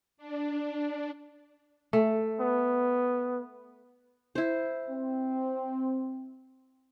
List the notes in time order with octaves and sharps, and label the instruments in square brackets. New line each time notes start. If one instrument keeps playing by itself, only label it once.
[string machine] D4
[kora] A3
[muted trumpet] B3
[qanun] E4 C5
[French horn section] C4